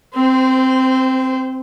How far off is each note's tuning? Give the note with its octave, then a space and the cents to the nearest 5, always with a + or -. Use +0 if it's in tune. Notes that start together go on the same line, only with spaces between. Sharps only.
C4 +0 C5 -25